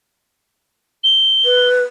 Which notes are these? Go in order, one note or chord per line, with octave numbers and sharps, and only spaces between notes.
G7
B4